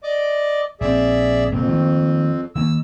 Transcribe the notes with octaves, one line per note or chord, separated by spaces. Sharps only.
D5 D#5 D6
A#1 C4 G#4 D5 E5
F1 F2 A#2 G#3 C4
D#3 A3 A#3
D#3 A#3 E6